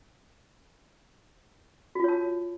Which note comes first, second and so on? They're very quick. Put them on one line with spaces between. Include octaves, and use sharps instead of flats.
F#4 F4 C#5 A5